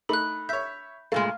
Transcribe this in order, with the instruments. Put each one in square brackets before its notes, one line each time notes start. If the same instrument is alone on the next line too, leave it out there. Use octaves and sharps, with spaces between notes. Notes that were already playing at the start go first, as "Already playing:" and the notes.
[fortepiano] A3 D#4 [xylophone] B5 F#6
[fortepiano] C#5 E5 [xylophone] G6 B6
[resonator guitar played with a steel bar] G2 A#2 G#3 [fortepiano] A3 [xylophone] F5 F6